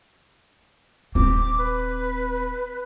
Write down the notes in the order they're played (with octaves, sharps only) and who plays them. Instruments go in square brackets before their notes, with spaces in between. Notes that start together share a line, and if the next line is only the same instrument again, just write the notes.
[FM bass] D#1 [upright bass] C4 [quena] D6
[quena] B4